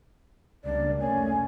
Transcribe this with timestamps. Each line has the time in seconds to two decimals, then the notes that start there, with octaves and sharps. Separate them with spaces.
0.64 C#2 G3 A#3 D4 D5
1.01 F1 A3 C#4 G#5